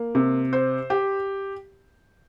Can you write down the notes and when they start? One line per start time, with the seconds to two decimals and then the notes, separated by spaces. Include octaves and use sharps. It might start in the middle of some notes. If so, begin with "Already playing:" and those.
Already playing: A#3
0.15 C3
0.53 C5
0.90 G4